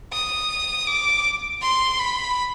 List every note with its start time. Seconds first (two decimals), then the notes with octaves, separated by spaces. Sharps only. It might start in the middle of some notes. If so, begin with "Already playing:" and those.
0.12 D#6
0.87 D6
1.61 C6
1.99 B5